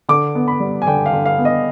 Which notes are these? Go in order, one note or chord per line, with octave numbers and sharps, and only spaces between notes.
D3 D6
B3
B5
G3
G#5
D3 G5
F5
D3
F5
B3
D#5